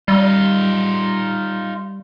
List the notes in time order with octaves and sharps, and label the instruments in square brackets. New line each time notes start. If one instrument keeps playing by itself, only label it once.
[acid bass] G3 [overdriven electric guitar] D#4 F4